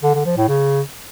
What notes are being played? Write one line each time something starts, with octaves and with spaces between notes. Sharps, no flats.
D3
D3
F3
A2
C#3